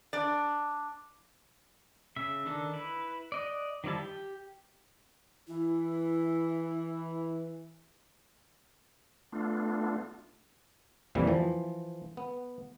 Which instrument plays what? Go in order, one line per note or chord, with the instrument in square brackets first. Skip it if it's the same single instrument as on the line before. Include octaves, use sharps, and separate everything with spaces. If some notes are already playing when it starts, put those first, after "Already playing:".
[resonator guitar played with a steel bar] D4 D5
[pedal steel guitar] C#3 E5
D#3 D4 A4
E4 B4
D5 D#5 F#6
D#3 F3 G3 E4 A5
G4
[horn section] E3 [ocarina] E4
[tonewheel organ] A3 B3 D4 F4
[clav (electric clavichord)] F2 A#2 E3 G3
E3 F3
B3